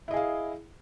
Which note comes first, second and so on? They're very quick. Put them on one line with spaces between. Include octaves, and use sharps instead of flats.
E4 D#5 G#4 F5